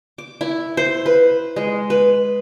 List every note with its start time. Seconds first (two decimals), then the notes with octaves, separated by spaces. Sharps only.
0.18 D6
0.41 E4
0.77 C5
1.06 B4
1.56 G#3
1.90 B4